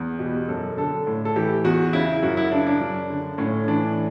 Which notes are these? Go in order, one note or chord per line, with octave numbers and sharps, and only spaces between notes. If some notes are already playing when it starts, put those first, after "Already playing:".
Already playing: E2
B2 G4
F#2 A4
D3 A4
A2
A4
E3 G4
E2 F#4
C#3 E4
F#2 F#4
E4
C#3 D4
D4
F#2
D3
A2 C#4
E3 D4